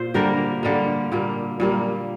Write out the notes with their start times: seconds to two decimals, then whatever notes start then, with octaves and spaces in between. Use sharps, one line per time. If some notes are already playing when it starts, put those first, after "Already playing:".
Already playing: A#2 F4 C5
0.14 D3 G3 A#3 G4 A#4
0.63 D3 G3 A#3
1.12 A#2 G3 A#3
1.60 A#2 G3 A#3